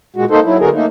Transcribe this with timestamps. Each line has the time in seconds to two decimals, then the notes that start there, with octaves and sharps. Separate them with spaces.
0.16 A#2 G#3 F#4
0.31 A#3 D#4 A4 C5
0.44 F#3 E4
0.60 D3 B3 F#4 G#4 A#4
0.73 A3 A#3 D#4